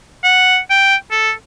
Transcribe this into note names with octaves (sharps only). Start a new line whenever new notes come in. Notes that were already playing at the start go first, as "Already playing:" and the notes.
F#5
G5
A4